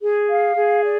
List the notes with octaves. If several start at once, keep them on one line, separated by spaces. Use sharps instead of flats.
G#4
F5
G#4
D5